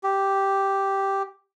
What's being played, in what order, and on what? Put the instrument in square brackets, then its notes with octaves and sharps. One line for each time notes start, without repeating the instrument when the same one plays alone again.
[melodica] G4